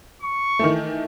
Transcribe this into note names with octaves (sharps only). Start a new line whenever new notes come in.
C#6
D#3 E3 A3